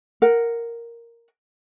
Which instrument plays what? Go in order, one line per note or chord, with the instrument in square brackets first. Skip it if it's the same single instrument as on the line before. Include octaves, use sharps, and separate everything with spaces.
[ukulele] A#4 F#5